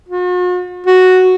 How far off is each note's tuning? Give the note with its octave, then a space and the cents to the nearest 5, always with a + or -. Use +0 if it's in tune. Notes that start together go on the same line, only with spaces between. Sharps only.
F#4 -45
F#4 -5